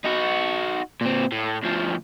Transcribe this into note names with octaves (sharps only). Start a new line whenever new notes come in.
D#4 F#4
A#2 C4
A2
D2 F3